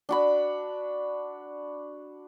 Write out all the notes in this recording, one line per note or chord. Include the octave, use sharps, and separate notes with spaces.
D4 F#4 B5